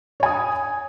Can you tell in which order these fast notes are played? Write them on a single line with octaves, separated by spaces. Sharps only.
C#5 G#5 D#6